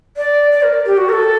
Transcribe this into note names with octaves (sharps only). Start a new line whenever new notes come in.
D5
D5
A#4
G4
F#4
A#4
A4